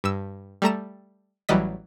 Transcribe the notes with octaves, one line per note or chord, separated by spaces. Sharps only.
G2 E6
G3 A3 A#5 E7
A1 E3 F#3 G3 D#5 B6